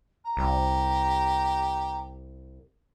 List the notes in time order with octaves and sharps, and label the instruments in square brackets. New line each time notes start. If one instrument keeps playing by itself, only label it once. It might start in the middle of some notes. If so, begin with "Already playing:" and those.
[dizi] A#5
[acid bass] C2 [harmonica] G4